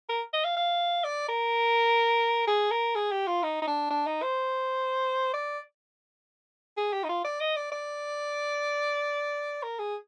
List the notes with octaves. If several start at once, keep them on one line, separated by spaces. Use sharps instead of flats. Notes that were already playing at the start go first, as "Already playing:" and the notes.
A#4
D#5
F5
F5
D5
A#4
G#4
A#4
G#4
G4
F4
D#4
D#4
D4
D4
D#4
C5
D5
G#4
G4
D#4
F4
D5
D#5
D5
D5
A#4
G#4